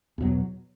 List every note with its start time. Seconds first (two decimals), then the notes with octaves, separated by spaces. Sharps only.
0.18 E2 B2 F#3